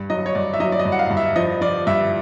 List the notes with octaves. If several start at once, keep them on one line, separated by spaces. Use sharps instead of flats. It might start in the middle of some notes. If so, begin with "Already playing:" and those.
Already playing: G2
F#3 D#5
C#5
G2 D5
E5
F#3 D#5
D5
D#5
G2
F#5
F5
G2
E5
F3 D#5
F3 D5
G2 E5